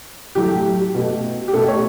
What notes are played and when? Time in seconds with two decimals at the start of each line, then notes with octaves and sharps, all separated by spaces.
0.35 A2 F#3 A3 G4
0.94 B2 A3
1.48 G4
1.53 B2 A3 A4
1.68 C#5